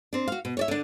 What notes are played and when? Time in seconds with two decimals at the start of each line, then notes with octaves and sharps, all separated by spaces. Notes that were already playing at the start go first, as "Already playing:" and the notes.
0.13 C4 D4
0.28 F#4 F5
0.45 B2
0.57 C#5 D5 E5
0.68 D3 D4